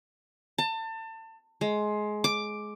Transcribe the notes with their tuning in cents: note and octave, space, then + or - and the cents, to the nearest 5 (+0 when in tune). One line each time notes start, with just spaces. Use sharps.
A5 +30
G#3 +20
D6 +5